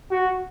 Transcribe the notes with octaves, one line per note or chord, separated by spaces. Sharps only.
F#4